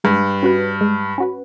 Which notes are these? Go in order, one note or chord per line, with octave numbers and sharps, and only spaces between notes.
G2 G#3
C#4 F#4 B4
G#3
C#4 F#4 B4